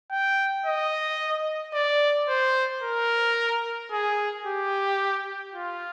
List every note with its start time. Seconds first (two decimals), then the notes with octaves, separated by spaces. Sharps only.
0.12 G5
0.66 D#5
1.74 D5
2.29 C5
2.83 A#4
3.92 G#4
4.46 G4
5.55 F4